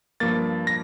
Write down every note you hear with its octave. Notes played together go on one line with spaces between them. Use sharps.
G2 F3 A#3 A6
A#6